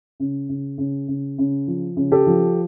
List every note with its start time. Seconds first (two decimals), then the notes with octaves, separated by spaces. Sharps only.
0.20 C#3
0.49 C#3
0.78 C#3
1.08 C#3
1.38 C#3
1.67 F3
1.97 C#3
2.12 G4 A4
2.26 F3